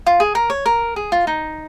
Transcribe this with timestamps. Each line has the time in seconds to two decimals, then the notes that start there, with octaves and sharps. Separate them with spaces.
0.07 F4
0.20 G#4
0.35 A#4
0.50 C#5
0.66 A#4
0.96 G#4
1.12 F4
1.27 D#4